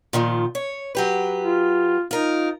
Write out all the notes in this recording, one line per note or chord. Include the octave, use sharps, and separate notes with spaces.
A#2 D#3 F3
C#5
F#3 G4 B4
F4
D#4 F4 A#4